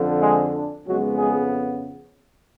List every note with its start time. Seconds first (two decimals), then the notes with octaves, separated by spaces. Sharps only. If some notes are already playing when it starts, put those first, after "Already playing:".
Already playing: F2 D3 F3
0.21 G#3 G#4
0.54 D4
0.86 F2 C#3 F#3 G#3 B3 F#4
1.18 G#3 G#4